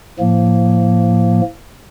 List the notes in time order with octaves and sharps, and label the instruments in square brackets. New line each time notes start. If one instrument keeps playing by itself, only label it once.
[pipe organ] A2 F3 A#3